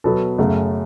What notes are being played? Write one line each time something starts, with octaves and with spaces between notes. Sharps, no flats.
B2 F#3 B3 A4
F#2 C#3 A3